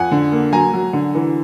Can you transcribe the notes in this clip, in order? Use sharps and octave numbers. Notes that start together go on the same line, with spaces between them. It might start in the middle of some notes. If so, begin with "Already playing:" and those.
Already playing: F2 F#5 G#5
D3
A#3
F#3 G#5 A#5
F#3
D3
E3